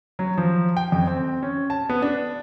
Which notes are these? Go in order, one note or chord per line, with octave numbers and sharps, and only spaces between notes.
F#3
F3
G5
F2
C4
C#4
A5
B3
D4